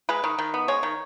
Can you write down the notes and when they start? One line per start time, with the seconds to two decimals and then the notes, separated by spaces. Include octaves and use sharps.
0.09 G#3 B4
0.24 D#3
0.38 D#3
0.54 B3
0.68 G#3 C#5
0.83 D#3